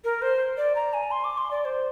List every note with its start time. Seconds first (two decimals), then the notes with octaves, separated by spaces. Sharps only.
0.04 A#4
0.22 C5
0.57 D5
0.75 A#5
0.94 G#5
1.11 C6
1.24 D6
1.38 C6
1.51 D5
1.65 C5